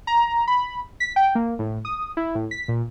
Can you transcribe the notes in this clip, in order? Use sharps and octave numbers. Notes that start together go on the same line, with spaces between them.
A#5
B5
B6
G5
A#3
A2
D#6
E4
A2
B6
A#2